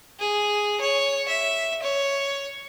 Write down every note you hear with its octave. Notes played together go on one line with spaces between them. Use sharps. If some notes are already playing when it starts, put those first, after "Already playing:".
G#4
C#5
E5
C#5